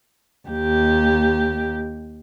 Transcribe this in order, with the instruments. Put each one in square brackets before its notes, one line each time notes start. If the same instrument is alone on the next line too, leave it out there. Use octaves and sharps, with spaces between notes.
[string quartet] D#2 G4